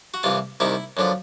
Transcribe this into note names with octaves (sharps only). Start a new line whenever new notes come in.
F#4
C2 C3 E3 F4
C2 C3 D#3 E4
F#2 D3 F3